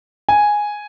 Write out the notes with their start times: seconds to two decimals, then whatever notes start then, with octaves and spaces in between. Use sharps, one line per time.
0.29 G#5